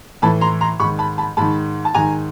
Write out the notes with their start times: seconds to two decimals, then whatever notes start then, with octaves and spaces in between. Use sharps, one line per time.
0.22 A2 E3 A5 B5
0.41 A#5 C6
0.61 A#5 C6
0.80 G#2 B5 C#6
0.84 D#3
0.99 A5 B5
1.18 A5 B5
1.37 G#2 D#3 A5 B5
1.85 A5
1.94 G#2 D#3 G#5 A#5